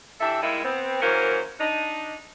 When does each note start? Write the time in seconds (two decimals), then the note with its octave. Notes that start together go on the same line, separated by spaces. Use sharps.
0.21 E3 D4 G4 A4 E5
0.42 G3 G#3 A#3 D#4 E4
0.64 B3 C4
1.02 E3 F#3 A#3 C#4 A#4 C5
1.59 D4 D#4